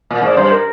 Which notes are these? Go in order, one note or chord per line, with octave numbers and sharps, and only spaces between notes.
A#2
G#2 D5
G2 C5
A#4